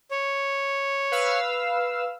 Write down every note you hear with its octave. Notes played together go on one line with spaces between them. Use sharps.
C#5
B4 F5 E6